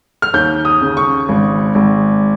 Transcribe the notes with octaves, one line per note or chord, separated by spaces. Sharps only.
F6
D#2 G6
D#6
C#3
C#6
G#1
G#1